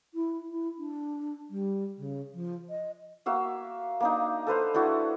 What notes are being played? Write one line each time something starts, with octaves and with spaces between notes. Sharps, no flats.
E4
E4
D4
G3
C#3
F3
D#5
A#3 F#4 E5 F5
A#3 D4 D#4
A4 B4 C5 F5
A3 D4 E4 F#4